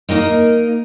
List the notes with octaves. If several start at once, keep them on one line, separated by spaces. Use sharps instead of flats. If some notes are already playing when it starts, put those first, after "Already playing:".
A#3 D#4 A#4 D#5